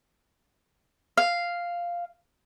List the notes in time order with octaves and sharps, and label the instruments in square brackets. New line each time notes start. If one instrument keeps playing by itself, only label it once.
[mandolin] F5